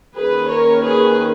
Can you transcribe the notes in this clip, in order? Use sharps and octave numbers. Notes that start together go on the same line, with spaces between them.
D#3 A#3 C#4 G#4 B4
A#4 C#5
G#4 B4